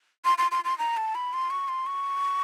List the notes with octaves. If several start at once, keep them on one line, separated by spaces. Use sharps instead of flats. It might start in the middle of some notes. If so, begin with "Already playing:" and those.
C6
C6
C6
C6
A#5
A5
B5
C6
C#6
C6
C#6